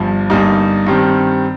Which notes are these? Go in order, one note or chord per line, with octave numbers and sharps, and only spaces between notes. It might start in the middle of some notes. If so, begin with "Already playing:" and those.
Already playing: G1 G2 F3
G1 G2 G3 A#3 D#4
G2 D#3 G3 C4